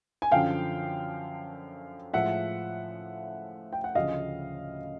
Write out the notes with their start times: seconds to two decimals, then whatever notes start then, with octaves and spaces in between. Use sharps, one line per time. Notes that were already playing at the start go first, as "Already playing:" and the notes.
0.22 G#5
0.31 F#2 D3 F3 F5 G5
2.13 A2 F3 G#3 E5 F#5
3.73 G5
3.84 F#5
3.95 D2 C#3 F3 D#5 F5